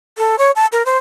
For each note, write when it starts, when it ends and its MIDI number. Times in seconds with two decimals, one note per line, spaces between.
0.18 0.36 69
0.38 0.51 73
0.56 0.66 81
0.72 0.83 70
0.86 0.97 72